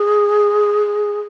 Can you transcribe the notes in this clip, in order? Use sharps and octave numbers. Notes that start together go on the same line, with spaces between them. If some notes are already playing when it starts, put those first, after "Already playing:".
Already playing: G#4